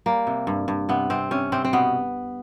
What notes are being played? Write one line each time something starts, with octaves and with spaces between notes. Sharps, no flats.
G3 A#3
C3
G2
G2
C3 B3
C3 C4
C3 C#4
C3 C4
C4
B2 B3